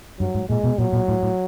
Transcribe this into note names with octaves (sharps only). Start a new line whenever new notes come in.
G2 F#3
G#2
A#2 G#3
B2
A#2 F#3
A#2
A2
A2